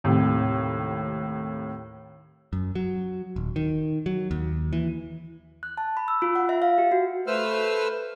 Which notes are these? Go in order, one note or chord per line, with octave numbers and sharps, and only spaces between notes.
D#2 A2 C3
F#2
F#3
D#1
D#3
F#3
D#2
E3
F#6
A5
B5
E6
F4
F#5
E5
F5
G4
F#4
A3 B4 C5 E6 F6